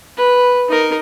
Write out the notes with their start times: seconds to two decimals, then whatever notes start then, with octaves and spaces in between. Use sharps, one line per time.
0.17 B4
0.69 D#4 A#4